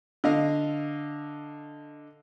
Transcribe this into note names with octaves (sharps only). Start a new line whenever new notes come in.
D3 D#5 F5